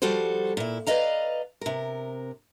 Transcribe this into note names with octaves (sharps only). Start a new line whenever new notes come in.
F3 G3 F#4 A4 C5
A#2 E4
B4 D5 D#5 F5 A#5
C3 A#4